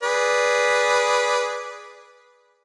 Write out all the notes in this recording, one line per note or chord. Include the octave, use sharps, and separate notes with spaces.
G#4 B4 D5